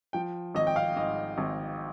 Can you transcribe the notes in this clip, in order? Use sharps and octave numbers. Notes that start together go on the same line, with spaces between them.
F3 G5
G#1 D#5
G5
F5
G#2 D#5
G#1